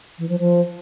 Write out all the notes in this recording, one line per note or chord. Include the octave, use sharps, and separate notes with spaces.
E3
F3
F3